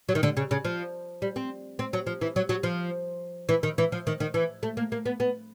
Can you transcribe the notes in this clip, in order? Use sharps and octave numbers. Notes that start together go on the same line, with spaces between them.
F#3
D#3
D3
C#3
C#3
F3
G3
C4
C4
F#3
F3
E3
F#3
F#3
F3
E3
D#3
E3
F3
D#3
D#3
E3
A3
A#3
A#3
B3
B3